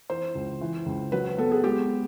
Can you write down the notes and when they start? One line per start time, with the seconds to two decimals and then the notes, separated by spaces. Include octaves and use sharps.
0.10 E3 C5
0.35 C#2
0.61 E3
0.86 C#2
1.12 F#3 B4
1.38 B3 A4
1.51 G#4
1.64 G#3 G4